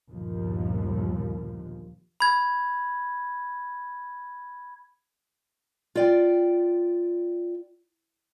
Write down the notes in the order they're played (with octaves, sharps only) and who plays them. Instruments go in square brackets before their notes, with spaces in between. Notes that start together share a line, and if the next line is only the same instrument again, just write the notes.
[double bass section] G1 D#2 A#2 F3
[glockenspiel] B5 G#6
[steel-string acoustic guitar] F4 D5 G5